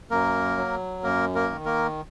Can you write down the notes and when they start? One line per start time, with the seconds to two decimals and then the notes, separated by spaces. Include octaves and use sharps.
0.11 F#2 A#3 A#4
0.57 F#3
1.03 F#2 A#3 A#4
1.35 A#3 A#4
1.50 D#3
1.65 A#3 A#4